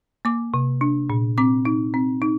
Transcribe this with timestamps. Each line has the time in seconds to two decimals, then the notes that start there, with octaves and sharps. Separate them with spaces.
0.25 A#3 D6
0.54 C3
0.81 D4
1.10 A#2
1.38 C4 D6
1.65 D#4
1.94 C4
2.22 D#4